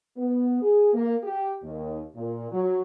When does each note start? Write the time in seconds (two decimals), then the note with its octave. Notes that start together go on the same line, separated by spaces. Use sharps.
0.17 B3
0.62 G#4
0.93 A#3
1.22 G4
1.62 D#2
2.15 A#2
2.51 F#3